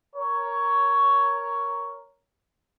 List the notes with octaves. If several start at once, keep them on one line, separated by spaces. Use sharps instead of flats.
A#4 C#5